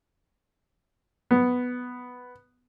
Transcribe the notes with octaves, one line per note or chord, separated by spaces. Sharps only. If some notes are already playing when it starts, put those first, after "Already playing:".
B3